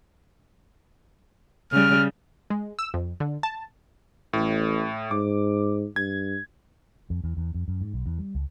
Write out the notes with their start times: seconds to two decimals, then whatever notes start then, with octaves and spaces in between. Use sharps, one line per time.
1.72 C#3 G3 F6
2.50 G#3
2.79 E6
2.94 F2
3.20 D3
3.43 A5
4.33 A1 A2
5.11 G#2 D6
5.96 G2 G#6
7.10 F2
7.24 E2
7.37 E2
7.54 F2
7.68 F#2
7.81 G#2
7.94 B1
8.06 E2
8.19 G3
8.35 C#2